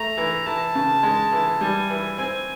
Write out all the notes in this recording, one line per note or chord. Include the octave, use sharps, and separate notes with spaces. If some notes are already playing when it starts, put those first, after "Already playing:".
Already playing: A3 A#5
E3
E3 A5
C#3
G#3
E3
G3 G#5
E3
C4 G#5